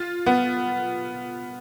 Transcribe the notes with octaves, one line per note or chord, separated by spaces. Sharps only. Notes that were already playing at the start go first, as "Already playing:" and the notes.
Already playing: F4
B3